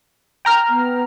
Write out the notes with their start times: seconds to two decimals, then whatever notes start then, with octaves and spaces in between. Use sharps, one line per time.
0.45 G5 A#5 F6
0.69 B3